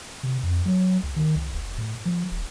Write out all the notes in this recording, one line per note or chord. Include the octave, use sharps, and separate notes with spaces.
C3
F2
F#3
C#2
D#3
C#2
F1
A2
F3
E1